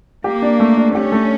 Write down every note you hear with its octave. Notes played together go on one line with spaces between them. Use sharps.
A#3 G4
D4
A3
D4
C#4 G4
A3